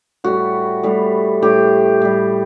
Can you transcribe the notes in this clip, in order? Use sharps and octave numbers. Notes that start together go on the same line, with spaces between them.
A2 G3 F#4
A2 G3
A2 G3 G4
A2 G3